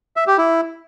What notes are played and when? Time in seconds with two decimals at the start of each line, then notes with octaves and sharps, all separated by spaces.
0.16 E5
0.27 G4
0.38 E4